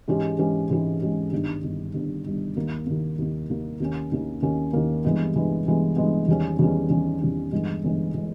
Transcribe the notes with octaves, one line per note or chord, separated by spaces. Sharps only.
G#2 E3 G#3 C#4 G4
G#2 E3 G#3 C#4 G4
G#2 E3 G#3 C#4 G4
G#2 E3 G#3 C#4 G4
G1 G2 D#3
G1 G2 D#3
G1 G2 D#3
G1 G2 D#3
D#2 D#3 A#3
D#2 D#3 A#3
D#2 D#3 A#3
D#2 D#3 A#3
D#2 D#3 A#3 C#4
D#2 D#3 A#3 C#4
D#2 D#3 A#3 C#4
D#2 D#3 A#3 C#4
G2 E3 G#3 B3
G2 E3 G#3 B3
G2 E3 G#3 B3
G2 E3 G#3 B3
E2 D#3 G3 C#4
E2 D#3 G3 C#4
E2 D#3 G3 C#4
E2 D#3 G3 C#4
G1 G2 E3 G#3
G1 G2 E3 G#3
E3 G#3